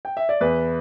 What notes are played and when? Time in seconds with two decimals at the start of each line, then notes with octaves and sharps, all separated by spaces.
0.05 G5
0.17 E5
0.29 D5
0.41 E2 B4